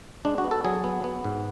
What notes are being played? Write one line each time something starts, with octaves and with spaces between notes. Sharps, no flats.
G#3 D4
F#4
B3
A4
F#3 G#4
B3
B3
G#2